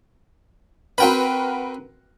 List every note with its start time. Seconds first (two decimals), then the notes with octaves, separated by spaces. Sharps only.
0.98 C4 F#4 A#4 B4 G5 B5